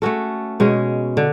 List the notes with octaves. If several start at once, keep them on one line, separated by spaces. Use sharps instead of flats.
A3 C#4 F#4 A4
B2 G#3 C#4
D3